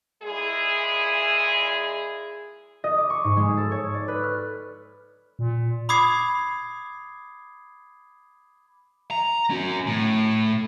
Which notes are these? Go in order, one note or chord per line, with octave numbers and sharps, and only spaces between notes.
A#2 G#3 E4 G#4
D#5
D6
C#6
G#2
G#3
A4
C#5
D5
B4
F6
A#2
B5 D6 D#6 G#6 C7
A#5
C#4 F#4
A2